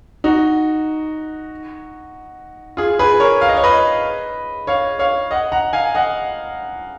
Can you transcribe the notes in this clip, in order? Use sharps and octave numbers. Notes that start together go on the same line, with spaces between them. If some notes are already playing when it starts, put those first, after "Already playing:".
D#4 F#4
F4 G#4
G#4 B4
A#4 C#5
F5
D#5
C#5
B4 D#5
C#5 F5
C#5 F5
D#5 F#5
F#5 A#5
F5 G#5
D#5 F#5